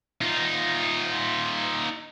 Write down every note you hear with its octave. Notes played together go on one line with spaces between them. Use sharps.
D#4 F4